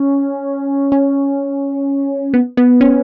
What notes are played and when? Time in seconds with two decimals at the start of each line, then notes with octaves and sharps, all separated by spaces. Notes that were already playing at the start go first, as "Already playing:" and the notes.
Already playing: C#4
0.92 C#4
2.34 B3
2.57 B3
2.81 C#4